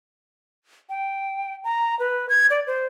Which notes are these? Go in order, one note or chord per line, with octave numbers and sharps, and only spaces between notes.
G5
A#5
B4
G#6
D5
C5